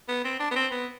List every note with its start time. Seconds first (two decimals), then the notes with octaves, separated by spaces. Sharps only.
0.09 B3
0.24 C4
0.40 D4
0.51 B3
0.55 C4
0.71 B3